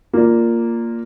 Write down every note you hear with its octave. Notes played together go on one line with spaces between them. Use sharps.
A#3 F4 D5